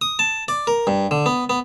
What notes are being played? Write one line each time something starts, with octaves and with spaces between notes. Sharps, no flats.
D#6
A5
D5
A#4
G2
D3
B3
B3